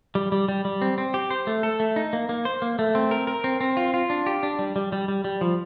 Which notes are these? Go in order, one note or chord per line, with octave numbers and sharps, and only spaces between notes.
G3
G3
G3
G3
C4
C4
G4
C5
A3
A4
A3
D#4
A#3
A#3
C5
A#3
A3
C4
A#4
A#4
C4
C4
F4
F4
D4
G4
D4
G3
G3
G3
G3
G3
F3